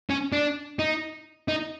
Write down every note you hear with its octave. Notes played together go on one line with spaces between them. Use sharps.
C#4
D4
D#4
D#4